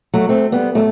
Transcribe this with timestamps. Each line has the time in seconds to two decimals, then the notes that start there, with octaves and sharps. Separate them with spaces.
0.14 F#3 A3
0.29 A3 C4
0.52 G3 B3
0.75 A2 F#3 A3